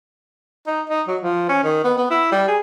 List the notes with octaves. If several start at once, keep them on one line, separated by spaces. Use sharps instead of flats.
D#4
D#4
F#3
F3
C#4
D#3
B3
B3
E4
G3
G#4